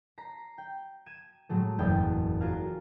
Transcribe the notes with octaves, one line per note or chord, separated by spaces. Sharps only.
A#5 B6 C7
G5
G#6 D#7 E7
A2 F#3 G#3 A3
F#1 E2 E4 G5 A6
F4 F#4 G#4 A#4 F5